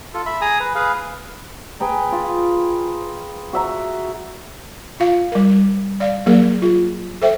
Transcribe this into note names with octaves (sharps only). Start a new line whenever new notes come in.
F4 A4
E5 B5
G#4 G#5 A#5 D#6
B4
G#4 B4 F5
G#4 B4 G5 A#5
F4
F#4 E5 A#5
F4 F5
G3 A#4
D5 F5
F#3 A#3 G#4 A#4
F4 G#4
A4 C5 E5 G5